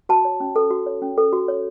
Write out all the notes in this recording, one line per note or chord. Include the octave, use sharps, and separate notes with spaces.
F#4 A5
C#5
C#4
A4
F#4
C#5
C#4
A4
F#4
C#5